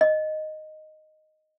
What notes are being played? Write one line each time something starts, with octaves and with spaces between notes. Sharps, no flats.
D#5